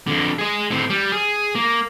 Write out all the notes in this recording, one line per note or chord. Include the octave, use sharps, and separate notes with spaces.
F2 D3
G#4 D#5
A2 C4
G3
G#4
A#3